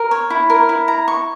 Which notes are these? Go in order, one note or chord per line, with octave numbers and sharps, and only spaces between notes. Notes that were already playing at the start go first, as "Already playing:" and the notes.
Already playing: A#4
C#5
E4
A#4
E4
A#5
C#6